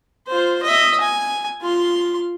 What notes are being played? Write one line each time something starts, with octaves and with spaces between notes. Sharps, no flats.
F4 C5
D#5 E5
G#5
F4 C6